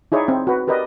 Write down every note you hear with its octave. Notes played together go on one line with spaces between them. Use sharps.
D#4 E4 G#4 C#5 D5
C4
F#4 B4
G4 A#4 B4 D5 D#5